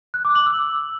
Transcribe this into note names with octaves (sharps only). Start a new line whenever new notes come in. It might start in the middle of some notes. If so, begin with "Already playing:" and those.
F#6
D6
F#7
E6